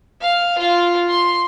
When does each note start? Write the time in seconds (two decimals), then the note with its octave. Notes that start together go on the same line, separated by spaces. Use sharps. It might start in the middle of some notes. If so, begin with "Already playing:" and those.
0.21 F5
0.58 F4
1.09 C6